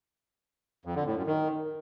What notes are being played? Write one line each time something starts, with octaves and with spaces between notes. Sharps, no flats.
F2
D3
A2
F#2
D#3